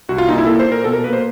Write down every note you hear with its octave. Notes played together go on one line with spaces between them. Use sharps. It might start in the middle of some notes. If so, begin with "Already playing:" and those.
C2 F#4
F4
A#2 D#4
E4
A#3 A4
C5
A#2
A#4
B2 A4
A#4
A#3 B4
C5